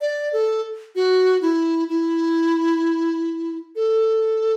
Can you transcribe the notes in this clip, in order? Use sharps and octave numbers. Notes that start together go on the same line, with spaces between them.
D5
A4
F#4
E4
E4
A4